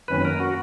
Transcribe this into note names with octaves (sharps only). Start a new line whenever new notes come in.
F#2 D#3 F#3 A#3 C#4 B4
A#4
F#4